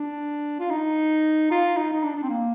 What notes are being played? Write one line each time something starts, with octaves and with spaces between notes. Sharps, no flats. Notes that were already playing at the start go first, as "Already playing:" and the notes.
Already playing: D4
F4
D#4
F4
D#4
D#4
D4
D4
C4
A#3